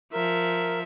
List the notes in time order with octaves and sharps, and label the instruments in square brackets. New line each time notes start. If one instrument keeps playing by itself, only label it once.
[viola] F3 E5 [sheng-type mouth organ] A#4